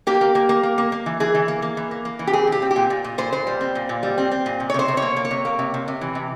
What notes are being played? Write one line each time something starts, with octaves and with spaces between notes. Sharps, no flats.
A#3 G4
A#3
A#3
A#3
A#3
A#3
A#3
E3
E3 G#4
E3
A#3
A#3
E3
A#3
A#3
E3
G4
C4 G#4
A#2 G4
C4
G4
A#2
A#2
A#2
A#2 C5
A#2 C5
G3
C4
A#2
A#2
G3
C4
C4
A#2
C3
C#5
C3 C5
C3
C#5
A#3
A#3
C#5
C3
A#3
C3
C3
C3
E3
C3